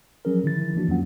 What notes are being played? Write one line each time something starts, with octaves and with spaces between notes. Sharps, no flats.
F3 F#3 C#4 G#4 A#4
D3 D#3 F3 E4 A6
E3 F3 A#3 D4 F#4
F2 F#3 A#3 C#4 F4 F#5